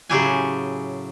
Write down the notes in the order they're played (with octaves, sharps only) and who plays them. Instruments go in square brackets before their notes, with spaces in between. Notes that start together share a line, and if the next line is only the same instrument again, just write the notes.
[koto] A2 C#3 F#3 G4 G#4 G#5